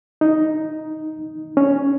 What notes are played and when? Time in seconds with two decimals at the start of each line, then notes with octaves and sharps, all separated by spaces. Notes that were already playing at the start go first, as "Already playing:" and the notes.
0.21 D#4
1.57 C#4